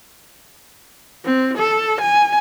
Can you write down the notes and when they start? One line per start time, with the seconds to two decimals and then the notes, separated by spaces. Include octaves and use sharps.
1.25 C4
1.58 A4
2.01 G#5